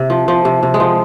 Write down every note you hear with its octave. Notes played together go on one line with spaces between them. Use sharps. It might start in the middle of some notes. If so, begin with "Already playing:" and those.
Already playing: C3
F3
F3
C3
C3
G#3
F3